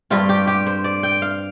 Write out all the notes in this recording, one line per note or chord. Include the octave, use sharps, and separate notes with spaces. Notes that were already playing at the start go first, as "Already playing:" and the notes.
G2 G3 C4 F4
G4
G4
C5
D5
G5
F5